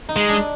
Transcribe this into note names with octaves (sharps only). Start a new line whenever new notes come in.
D#4
G#3
D4